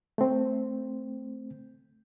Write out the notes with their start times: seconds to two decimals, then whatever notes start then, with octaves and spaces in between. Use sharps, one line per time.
0.18 A3 C4